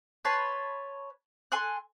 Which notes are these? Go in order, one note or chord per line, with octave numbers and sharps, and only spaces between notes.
B4 C#5 A5 C6
A4 G#5 C6 F#6